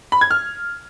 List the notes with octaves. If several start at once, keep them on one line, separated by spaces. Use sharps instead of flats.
B5
G#6
F6